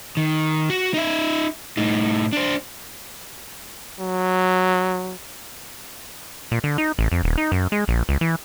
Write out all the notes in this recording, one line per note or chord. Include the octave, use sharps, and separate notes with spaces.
D#3
F#4
D#4 E5
A2 D#4
D4 C5
F#3
A#2
D3
D#4
A1
F2
D#1
D#4
F#2
G#3
A#1
C#2
E3